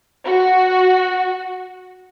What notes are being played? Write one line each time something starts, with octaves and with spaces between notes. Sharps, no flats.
F#4